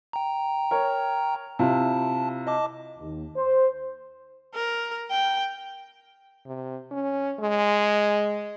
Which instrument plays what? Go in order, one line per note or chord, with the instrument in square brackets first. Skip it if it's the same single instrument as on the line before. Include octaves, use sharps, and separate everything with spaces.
[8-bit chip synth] G5 A#5
[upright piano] A#4 C#5
[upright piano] C3 E4 F4 [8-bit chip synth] A5
[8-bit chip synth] D#5 A5 D6
[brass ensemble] D#2
C5
[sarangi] A#4
G5
[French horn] C3
C#4
G#3